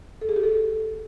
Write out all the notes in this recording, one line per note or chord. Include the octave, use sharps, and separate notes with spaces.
A4
G#4
G4
A4